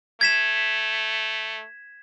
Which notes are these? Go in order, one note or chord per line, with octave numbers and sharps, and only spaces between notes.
A3 G#6 B6 E7